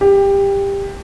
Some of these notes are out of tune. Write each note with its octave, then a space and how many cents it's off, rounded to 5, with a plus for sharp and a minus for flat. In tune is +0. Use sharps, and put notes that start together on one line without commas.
G4 +15